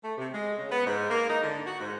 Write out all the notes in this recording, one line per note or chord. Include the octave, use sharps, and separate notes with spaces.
A3
C3
G#3
C#3
B3
G#2
A#3
D#4
D3
F#4
G#2